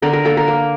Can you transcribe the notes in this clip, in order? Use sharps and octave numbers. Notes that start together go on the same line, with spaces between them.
D3 A#4
A#4
A#3 A4
A#4
A#3